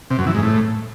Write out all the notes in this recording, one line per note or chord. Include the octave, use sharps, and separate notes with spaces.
C3
F#2
E3
G#2
A2